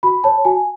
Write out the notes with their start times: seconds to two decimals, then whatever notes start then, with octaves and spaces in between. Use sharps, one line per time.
0.03 F#4 B5
0.24 C#5 A5
0.45 F#4 G#5